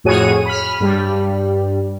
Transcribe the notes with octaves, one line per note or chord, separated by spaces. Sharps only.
F2 A2 F#4 G#4 C#5 D#7
B5 F6
G2 G3